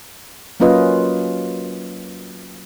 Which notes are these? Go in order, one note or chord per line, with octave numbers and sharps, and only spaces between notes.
F#3 A#3 C#4 F4 B4 D#5